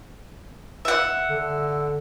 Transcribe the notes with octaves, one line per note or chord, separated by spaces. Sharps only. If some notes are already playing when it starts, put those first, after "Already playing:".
E5 F#5
D3